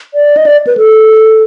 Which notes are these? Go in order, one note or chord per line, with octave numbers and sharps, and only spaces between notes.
D5
D#5
D5
B4
A4